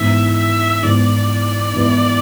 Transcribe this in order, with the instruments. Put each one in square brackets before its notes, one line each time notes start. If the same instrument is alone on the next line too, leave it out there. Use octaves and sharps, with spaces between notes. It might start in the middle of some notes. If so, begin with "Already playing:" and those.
Already playing: [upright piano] G#2 E3 B3 E4 [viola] E5
[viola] E5
[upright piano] G#2 E3 B3 E4 [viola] D5
[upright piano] G#2 E3 B3 E4